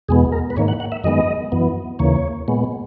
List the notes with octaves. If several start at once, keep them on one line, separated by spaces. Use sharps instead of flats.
E2 B2 G#3 B3 G#4
A#4
B4
G#2 D#3 A#3 C#5
F#5
F#5
E5
F#2 D#3 G#3 B3 D#5
F#2 E3 B3
D#2 C#3 E3 A#3 C#5
A#2 G#3 B3